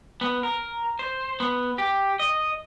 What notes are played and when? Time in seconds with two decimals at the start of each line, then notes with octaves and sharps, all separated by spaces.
0.21 B3
0.43 A#4
0.99 C5
1.40 B3
1.78 G4
2.19 D#5